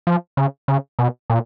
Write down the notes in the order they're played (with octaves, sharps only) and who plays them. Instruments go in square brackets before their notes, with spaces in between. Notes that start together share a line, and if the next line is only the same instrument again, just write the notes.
[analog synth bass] F3
C#3
C#3
B2
A#2